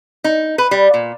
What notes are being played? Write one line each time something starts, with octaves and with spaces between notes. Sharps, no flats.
D#4
B4
G3
A#2